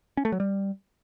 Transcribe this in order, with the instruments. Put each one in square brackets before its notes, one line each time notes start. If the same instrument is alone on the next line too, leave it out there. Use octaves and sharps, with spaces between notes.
[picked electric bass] C#4
A3
F#3
G3